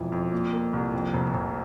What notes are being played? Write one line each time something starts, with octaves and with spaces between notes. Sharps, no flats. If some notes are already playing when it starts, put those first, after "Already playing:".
Already playing: E1 F2 E3
F2
A#2
A#3
C2
F2
F1
F1